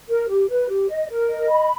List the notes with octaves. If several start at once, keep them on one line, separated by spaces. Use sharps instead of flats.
A#4
G4
B4
G4
D#5
A#4
D#5
B5